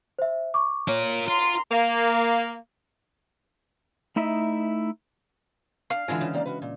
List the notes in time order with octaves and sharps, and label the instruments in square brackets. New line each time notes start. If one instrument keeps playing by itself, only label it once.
[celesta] C5 E5
C#6 D6
[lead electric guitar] F4 A#4 [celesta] C#5
[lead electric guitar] F4 [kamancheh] A#5 C6
[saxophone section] A#3
[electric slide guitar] A3 D#4 E4 D#5 E5
[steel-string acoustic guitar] D4 [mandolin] F5
[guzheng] D3 E3 G#3 [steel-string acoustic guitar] E4 F4 G#5
[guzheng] C#3
[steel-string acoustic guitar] D#3 A#3 D5
F#4 B4
A#2